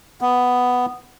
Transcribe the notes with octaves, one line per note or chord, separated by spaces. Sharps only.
B3